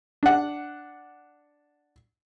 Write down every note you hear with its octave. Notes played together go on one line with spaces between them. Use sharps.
D4 F#5